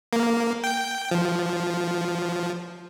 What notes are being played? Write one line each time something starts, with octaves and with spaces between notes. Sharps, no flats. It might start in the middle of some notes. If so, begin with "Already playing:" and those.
A#3
G5
F3